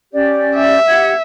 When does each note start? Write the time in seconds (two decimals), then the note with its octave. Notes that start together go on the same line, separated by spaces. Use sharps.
0.13 C#4 G4 D5
0.56 E5
0.87 G4 F#5 G#6